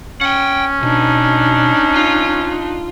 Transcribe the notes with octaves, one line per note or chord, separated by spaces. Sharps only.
C#4 F#5 G5
B2 D4 D#4
F4